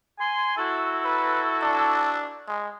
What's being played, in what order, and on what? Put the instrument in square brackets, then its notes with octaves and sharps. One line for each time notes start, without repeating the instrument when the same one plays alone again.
[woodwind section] G#5 C6
E4 F#4 A4
[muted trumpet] B4
D4
G#3